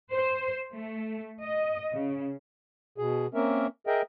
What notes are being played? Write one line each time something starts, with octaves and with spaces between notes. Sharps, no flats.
C5
A3
D#5
C#3
B2 G#4
A#3 C4 C#4 A#4 E5
G#4 A#4 D#5 E5 G5